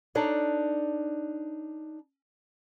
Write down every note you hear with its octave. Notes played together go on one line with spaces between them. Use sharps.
D4 D#4 A4 C#5 D5